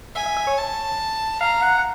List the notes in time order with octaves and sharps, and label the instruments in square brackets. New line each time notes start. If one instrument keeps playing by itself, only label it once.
[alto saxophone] E5 [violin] G#5
[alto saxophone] E5
E5
C#5
[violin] A5
[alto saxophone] F5 [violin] A#5
[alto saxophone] F#5
F#5